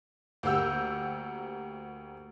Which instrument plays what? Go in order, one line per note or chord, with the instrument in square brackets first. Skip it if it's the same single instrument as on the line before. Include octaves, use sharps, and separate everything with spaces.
[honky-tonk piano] D2 A#3 G4 F#5 E6 G6